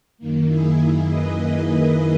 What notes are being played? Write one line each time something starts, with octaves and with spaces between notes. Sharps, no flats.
F#2 D#3 A#3
E4 G#4
B4 D#5
G#4 B4